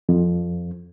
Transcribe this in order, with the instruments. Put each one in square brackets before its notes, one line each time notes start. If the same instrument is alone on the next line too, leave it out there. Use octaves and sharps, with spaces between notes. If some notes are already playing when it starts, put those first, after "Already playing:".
[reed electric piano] F2